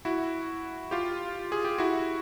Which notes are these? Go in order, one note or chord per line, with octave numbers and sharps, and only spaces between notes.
E4 F#4
F4 G4
G#4
G4
E4 F#4